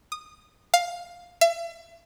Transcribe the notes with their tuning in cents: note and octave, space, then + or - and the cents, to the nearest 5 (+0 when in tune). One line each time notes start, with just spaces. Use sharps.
D#6 -20
F5 +10
E5 +40